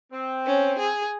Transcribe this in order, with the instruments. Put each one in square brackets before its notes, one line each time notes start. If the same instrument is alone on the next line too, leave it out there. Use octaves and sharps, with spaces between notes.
[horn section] C4
[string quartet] C#4
G#4